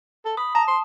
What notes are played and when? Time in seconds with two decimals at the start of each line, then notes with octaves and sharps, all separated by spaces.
0.25 A4
0.37 B5 D#6
0.55 A5 A#5
0.68 C6